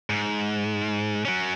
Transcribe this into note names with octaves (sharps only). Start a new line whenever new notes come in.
G#2
F#3 C#4